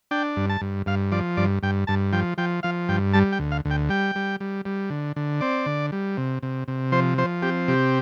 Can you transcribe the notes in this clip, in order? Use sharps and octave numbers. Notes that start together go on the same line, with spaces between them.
D4 G5
G2
A5
G2
G2 F5
F3 D5
G2 D5
G2 G5
G2 A5
F3 G5
F3 G5
F3 F5
G2 G5
G3 A5
G5
D2
F5
D2
G5
G3 G5
G3
G3
G3
D3
D3
C4 D5
D3
G3
C3
C3
C3
F3 C5
F3 C5
C4 G4
C3 G4